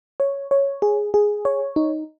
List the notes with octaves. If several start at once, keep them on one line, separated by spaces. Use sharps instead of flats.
C#5
C#5
G#4
G#4
C#5
D#4